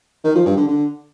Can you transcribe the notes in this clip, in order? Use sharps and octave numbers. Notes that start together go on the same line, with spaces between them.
D#3
F3
G2
D3
D3